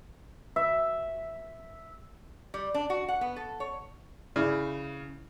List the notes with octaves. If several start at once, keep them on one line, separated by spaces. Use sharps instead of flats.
E5
G3
D4
F#4
F#5
B3
A4
C#5
C#3 E4 D5